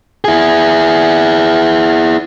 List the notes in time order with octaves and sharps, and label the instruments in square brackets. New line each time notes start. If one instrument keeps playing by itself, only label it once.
[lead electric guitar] E4 G#4